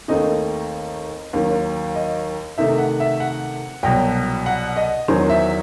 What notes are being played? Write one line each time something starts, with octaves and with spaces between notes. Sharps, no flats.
D#2 D#3 A3 C4 D#4 D#5
D#2 D#3 F#3
D#5
C3 D#3 A3 D#4 E5
F#5
E5
F#5
C2 B2 F#3 G5
F#5
D#5
E2 D#3 F#3 C5
E5